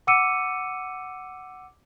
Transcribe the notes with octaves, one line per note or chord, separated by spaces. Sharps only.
F#5 D6 E6 C#7 D#7